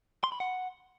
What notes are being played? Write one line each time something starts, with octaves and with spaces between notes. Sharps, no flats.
C6
B5
F#5